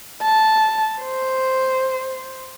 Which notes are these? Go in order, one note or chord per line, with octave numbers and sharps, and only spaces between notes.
A5
C5